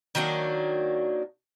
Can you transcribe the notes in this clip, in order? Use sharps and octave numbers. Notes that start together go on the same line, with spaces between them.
D#3 F#3 A#3 D4